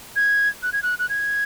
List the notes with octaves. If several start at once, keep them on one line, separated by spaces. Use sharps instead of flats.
G#6
F#6
G#6
F#6
F#6
G#6